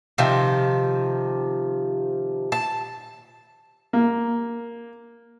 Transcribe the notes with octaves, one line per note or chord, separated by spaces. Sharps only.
C3 D#3 F3
A5
A#3